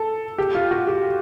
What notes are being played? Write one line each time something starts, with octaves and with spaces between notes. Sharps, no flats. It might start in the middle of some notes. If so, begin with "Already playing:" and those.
Already playing: A4
G4
F4
F#4
G4